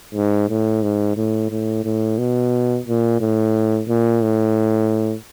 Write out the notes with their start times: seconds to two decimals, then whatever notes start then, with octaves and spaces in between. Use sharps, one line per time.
0.15 G#2
0.49 A2
0.83 G#2
1.17 A2
1.51 A2
1.85 A2
2.18 B2
2.87 A#2
3.21 A2
3.89 A#2
4.23 A2